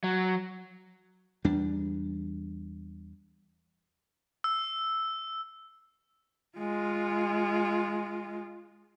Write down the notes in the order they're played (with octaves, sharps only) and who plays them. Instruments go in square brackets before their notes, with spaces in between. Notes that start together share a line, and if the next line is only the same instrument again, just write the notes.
[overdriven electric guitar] F#3
[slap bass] E2 G3 D4
[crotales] E6
[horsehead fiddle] G#3 F4